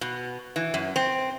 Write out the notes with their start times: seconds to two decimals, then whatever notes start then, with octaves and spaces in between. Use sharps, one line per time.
0.01 B2
0.56 E3
0.74 F#2
0.96 C4